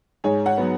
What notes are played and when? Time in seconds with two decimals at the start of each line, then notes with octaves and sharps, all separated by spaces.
0.24 G#2 G#4 C#5
0.46 C#5 F#5
0.57 F#3 B3